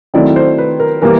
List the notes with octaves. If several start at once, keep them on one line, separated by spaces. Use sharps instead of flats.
D#3 F#3 A3 C4 E4 D5
C5
B4
A#4
E3 G3 A#3 A#4